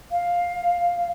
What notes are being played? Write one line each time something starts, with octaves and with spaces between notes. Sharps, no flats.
F5